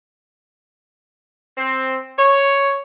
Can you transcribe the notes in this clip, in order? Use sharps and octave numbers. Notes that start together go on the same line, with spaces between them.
C4
C#5